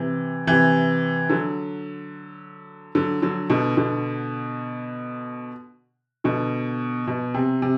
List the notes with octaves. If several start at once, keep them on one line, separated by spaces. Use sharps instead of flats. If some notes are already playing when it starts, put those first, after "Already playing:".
Already playing: C3 E3
C3 E3
D3 F#3
D3 F#3
D3 F#3
B2 D3
B2 D3
B2 D3
B2
C3
C3